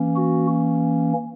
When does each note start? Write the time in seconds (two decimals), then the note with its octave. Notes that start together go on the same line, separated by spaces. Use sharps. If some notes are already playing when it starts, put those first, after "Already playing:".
Already playing: E3 A#3 C#4
0.16 F#4